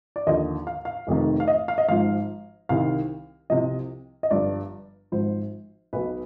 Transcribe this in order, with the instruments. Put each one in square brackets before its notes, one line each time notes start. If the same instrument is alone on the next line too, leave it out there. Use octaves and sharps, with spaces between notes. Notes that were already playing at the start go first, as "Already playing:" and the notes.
[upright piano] D5
D#2 D3 F3 D#5
F5
F5
F1 F2 C3 D#3
F5
D#5
F5
D#5
G#1 G#2 F3 F5
C2 C3 D#3 F5
C2 C3 F3 D#5
D#5
G1 G2 F3 D5
G#1 G#2 F3 C5
B1 B2 B4